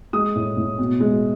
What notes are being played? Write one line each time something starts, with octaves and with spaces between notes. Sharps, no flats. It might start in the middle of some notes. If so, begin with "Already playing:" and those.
G#3 D#6
A2
A2
B2
G#3